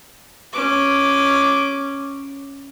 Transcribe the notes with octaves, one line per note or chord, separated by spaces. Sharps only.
C#4 D6